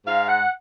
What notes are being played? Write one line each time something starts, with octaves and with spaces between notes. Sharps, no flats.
G#2 F5
F#5